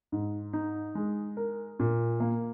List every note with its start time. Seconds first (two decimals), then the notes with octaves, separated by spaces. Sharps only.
0.12 G#2
0.53 D#4
0.95 G#3
1.37 A#4
1.80 A#2
2.20 A#3